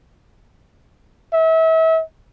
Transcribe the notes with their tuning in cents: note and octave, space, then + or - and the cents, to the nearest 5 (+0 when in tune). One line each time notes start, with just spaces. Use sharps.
E5 -35